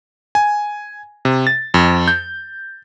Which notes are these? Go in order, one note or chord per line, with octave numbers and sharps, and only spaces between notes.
G#5
C3
A6
F2
G6